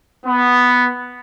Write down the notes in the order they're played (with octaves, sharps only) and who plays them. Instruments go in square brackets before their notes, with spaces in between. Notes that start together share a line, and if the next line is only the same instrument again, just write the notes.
[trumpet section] B3